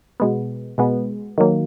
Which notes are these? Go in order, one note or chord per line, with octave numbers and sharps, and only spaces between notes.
B2 G#3 B3
B2 G#3 B3
D#3 F#3 A#3